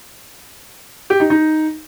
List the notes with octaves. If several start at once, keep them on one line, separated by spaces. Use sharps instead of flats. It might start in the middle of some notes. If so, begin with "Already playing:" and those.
G4
D#4
D#4